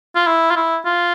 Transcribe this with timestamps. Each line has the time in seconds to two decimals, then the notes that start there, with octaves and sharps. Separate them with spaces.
0.15 F4
0.27 E4
0.51 F4
0.56 E4
0.86 F4